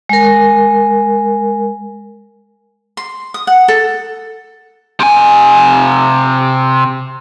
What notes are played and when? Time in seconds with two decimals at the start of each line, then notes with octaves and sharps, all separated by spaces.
0.09 G#3 A#4
2.97 C6
3.34 D#6
3.47 F#5
3.68 A4
5.00 C3 G#5